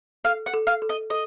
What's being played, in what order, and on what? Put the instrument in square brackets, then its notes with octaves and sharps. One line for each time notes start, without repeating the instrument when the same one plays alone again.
[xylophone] A4 [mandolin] F5
[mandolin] F#5
[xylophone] A4
[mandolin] F5
[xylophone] A4
[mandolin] D#5
[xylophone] A4 [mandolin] D#5